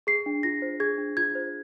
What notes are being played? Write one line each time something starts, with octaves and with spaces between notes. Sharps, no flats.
G#4 C7
D4
F4 A#6
C5
G#4 G#6
D4
F4 G#6
C5